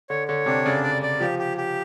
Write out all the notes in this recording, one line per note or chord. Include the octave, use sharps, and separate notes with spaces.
D3 C#5
D3 C#5
C3 D4
C#3 D5
D5
D5
F3 G4
G4
G4